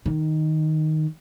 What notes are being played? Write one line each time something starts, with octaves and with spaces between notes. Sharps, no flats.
D#3